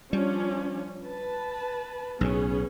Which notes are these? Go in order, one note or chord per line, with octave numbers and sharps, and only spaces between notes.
F3 G3 C#4 D4
B4 A5
B1 A2 B3 C#4 G#4